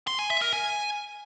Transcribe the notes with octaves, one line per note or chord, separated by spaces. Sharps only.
C6
G#5
E5
A#4
G#5